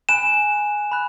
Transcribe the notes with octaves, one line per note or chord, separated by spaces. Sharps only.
G#5 B5 F#6 E7
B5 F#6